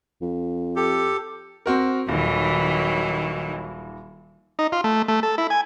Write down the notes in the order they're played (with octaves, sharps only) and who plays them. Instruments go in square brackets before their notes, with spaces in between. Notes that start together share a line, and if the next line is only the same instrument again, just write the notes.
[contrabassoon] F2
[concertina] G4 A4
[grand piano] C4 F#4 A#4
[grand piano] D#1 [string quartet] D#3 E3 F#3
[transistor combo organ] D#4
F4
A3
A3
A4
E4
G#5